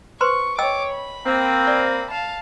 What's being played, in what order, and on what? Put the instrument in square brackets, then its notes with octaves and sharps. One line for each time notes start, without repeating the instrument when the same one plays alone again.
[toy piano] B4 C5 C6 [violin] C#6
[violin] C#5 D6 [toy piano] D#5 G5 E6
[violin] B5
[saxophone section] A#3 C4
[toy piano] D5
[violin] F5 A5